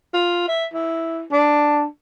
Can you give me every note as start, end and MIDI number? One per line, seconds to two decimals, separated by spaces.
0.14 0.46 65
0.48 0.66 76
0.74 1.22 64
1.33 1.84 62